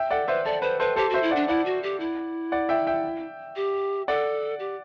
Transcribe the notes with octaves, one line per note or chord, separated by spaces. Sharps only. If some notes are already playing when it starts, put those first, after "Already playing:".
Already playing: E5 G5
A4 D5 F#5
B4 C5 E5
A4 D5
B4 C5
A4 B4 C5
G4 A4 C5
F#4 C5 E5
E4
D4 D5 F#5
E4 D5 F#5
F#4
G4
E4
D5 F#5
E5 G5
E5 G5
G4
A4 D5 F#5
G4